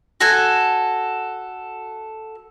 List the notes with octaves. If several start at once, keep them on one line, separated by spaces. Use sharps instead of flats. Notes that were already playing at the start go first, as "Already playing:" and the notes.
F#4 A4 G#5